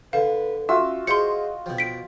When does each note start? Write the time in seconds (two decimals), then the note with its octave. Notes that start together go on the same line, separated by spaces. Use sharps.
0.13 D3 B4 F5
0.69 C#4 F4 F#4 E5 E6
1.07 G#4 C5 D#5 F5 C6 C#7
1.66 B2 F3 G5
1.78 B6 D7